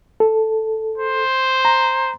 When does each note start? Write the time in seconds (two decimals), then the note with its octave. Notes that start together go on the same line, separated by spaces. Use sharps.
0.20 A4
0.98 C5
1.65 A#5